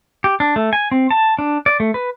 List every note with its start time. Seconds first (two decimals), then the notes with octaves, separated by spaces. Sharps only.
0.24 G4
0.40 D4
0.56 A3
0.73 G#5
0.92 C4
1.11 A5
1.39 D4
1.66 D5
1.80 A3
1.94 B4